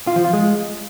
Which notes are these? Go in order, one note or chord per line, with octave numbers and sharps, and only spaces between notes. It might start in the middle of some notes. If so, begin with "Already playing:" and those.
F4
F3
F4
G#3